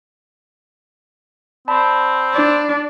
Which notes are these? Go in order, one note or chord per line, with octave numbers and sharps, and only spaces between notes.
C4 D5 A5 B5
D4